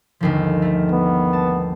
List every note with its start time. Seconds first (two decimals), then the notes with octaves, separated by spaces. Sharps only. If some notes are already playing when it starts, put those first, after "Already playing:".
0.20 G1 D#2 F3
0.62 A3 A#4
0.92 B3
1.33 A5